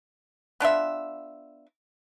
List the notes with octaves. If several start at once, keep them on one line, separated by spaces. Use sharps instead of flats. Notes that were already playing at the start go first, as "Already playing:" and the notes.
B3 D4 F4 E5